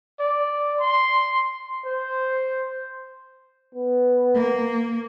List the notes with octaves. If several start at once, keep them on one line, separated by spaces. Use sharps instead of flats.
D5
C6
C5
B3
A#3